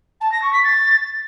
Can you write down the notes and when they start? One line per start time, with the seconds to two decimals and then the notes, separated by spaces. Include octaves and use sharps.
0.20 A5
0.31 A#6
0.42 C#6
0.53 B6
0.63 A6